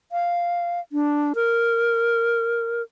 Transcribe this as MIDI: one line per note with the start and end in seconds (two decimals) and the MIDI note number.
0.12 0.80 77
0.92 1.33 62
1.35 2.82 70